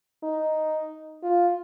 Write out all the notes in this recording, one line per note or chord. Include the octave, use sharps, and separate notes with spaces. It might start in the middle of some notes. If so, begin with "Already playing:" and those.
D#4
F4